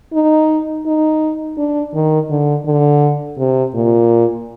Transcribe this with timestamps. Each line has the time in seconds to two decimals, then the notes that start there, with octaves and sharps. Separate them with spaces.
0.13 D#4
0.86 D#4
1.57 D4
1.94 D#3
2.30 D3
2.66 D3
3.38 C3
3.75 A#2